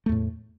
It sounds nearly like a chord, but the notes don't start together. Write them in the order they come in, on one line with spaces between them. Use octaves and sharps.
A3 E2 A2